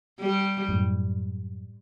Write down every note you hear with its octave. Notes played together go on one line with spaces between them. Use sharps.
G3
F#2 A2